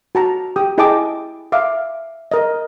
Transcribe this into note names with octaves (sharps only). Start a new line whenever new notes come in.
F#4 A5 A#5
G4 G5 D#6
E4 G#4 D#5 G5 A5 D6
E5 F5 D6
A#4 D#5